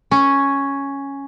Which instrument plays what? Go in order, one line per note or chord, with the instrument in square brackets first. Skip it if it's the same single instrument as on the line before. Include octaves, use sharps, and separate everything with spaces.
[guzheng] C#4